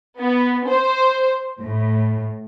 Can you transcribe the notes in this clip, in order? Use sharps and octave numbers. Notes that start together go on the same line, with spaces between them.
B3
C5
A2